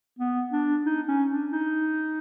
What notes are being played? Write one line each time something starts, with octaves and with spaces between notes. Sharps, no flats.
B3
D4
D#4
C#4
D4
D#4